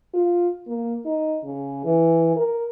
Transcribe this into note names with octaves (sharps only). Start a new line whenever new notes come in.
F4
A#3
D#4
C#3
E3
A#4